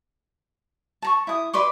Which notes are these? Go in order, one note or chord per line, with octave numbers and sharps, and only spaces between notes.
A5 A#5 C#6
E4 D#6
B4 D5 C6 D6